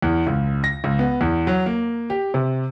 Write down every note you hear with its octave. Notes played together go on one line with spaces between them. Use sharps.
E2
C#2
A#6
C#2
B3
E2
F#3
A#3
G4
C3